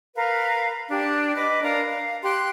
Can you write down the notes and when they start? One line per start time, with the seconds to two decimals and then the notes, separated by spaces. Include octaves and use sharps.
0.16 A#4 B4 F5
0.90 D4 G4
1.36 B4 D#5 D6
1.62 D4 A#4 F5
1.89 F5
2.23 G4 C6 F#6